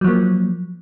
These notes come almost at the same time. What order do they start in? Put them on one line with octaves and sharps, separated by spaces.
F#3 F3 A#3